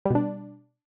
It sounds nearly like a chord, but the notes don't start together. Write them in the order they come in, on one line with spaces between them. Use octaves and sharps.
G3 B2 D4